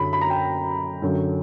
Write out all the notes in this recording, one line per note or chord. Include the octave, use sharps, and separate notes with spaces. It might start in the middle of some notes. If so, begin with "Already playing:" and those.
Already playing: F#2 D3 F#3 B5
B5
A#5
G5
F#2 D3 F#3